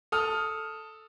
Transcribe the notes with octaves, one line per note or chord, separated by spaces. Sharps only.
A4 D#6 F6